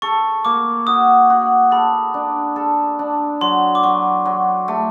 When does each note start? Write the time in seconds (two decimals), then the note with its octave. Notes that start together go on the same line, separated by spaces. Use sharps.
0.02 A4 C#6
0.45 A#3 D6
0.87 F#4 D#6
1.30 F#4
1.71 A4 B5
2.14 D4
2.56 A4
2.99 D4
3.41 F#3 C6
3.75 D6
3.83 F#3 C#6
4.25 F#3
4.68 A3